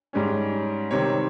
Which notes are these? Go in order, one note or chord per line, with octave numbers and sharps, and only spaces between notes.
G#2 G3 C#4
C3 D#3 G3 C4 C#5